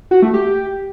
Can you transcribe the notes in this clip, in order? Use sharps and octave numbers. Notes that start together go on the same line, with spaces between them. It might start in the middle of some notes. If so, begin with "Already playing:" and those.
F#4
A3
G4